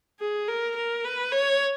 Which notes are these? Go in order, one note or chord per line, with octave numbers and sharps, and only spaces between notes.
G#4
A#4
A#4
B4
C#5